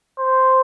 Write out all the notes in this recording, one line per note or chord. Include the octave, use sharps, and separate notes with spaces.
C5